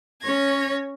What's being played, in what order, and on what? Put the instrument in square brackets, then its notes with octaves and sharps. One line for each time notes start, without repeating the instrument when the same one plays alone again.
[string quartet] C#4 C#5 G#6 A#6